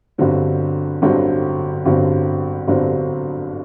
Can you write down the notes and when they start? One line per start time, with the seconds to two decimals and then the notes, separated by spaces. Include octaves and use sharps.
0.18 G1 G2 D3 F#3 C4
1.02 G1 G2 D3 F#3 C4
1.85 G1 G2 D3 F#3 C4
2.67 G1 G2 D3 F#3 C4